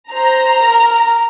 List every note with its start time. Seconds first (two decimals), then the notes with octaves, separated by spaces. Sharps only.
0.11 C5 A#5
0.63 A#4